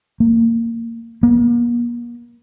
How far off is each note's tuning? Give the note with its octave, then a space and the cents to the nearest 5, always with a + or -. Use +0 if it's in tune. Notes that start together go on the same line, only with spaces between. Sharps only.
A#3 -20
A#3 +40